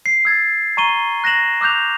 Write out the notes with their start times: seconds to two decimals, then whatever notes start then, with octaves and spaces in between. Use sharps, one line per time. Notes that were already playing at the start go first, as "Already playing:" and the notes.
0.06 C7
0.25 E6 G#6 A6
0.77 A#5 C#6 D#7 G7
1.24 F#6 A#6 C7 E7 F#7
1.61 D6 E6 F#6 G6 F7